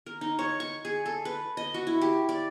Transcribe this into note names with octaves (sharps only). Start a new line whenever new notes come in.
A#4
D#4
C#5
C#6
G#4
A4
B4
D#5
F#4
E4
G4
D5